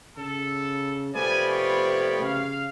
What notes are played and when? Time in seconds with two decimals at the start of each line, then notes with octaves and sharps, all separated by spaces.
0.17 C#3 A4
1.15 C3 F3 A3 B3 D5 G5 G#5 B5
1.51 C#5
2.21 C#3 F5